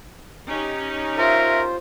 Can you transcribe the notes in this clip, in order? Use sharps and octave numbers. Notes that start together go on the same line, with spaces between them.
C#4 D#4 G4
F4 A#4 C5 E5